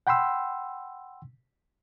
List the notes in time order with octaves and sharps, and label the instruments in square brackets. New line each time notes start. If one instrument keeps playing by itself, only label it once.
[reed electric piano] F#5 G5 B5 C6 E6